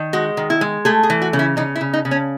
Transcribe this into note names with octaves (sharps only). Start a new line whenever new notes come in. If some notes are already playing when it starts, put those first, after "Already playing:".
Already playing: D#3
G#3 F#4
D#3
E4
G#3
A3 G#4
G#4
E3
F#4
C#3
E4
C#3 D#4
E4
C#3
D#4
C#3
C#4